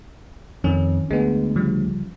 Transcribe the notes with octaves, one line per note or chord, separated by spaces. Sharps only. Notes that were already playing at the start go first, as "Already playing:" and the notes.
F2 D#3 C#4
D2 G#3 B3
C#3 F3 G3